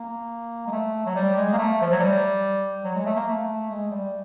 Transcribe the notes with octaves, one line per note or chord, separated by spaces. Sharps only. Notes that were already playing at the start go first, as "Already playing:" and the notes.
Already playing: A#3
G#3
A3
F#3
G3
G#3
A#3
A3
F3
F#3
G3
F#3
G#3
A3
A#3
A3
G#3
G3